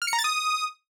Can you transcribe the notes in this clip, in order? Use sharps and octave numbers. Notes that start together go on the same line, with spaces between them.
F6
C#7
A#5
A6
D#6